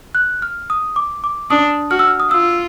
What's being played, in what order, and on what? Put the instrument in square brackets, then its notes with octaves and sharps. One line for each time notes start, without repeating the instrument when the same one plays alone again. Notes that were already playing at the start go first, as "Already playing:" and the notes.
[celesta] F#6
F6
D#6
D6
D6
[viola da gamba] D4 [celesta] D#6
[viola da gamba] F#4 [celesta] F6
[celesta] E6
F6
D#6
[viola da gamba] F4 [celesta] E6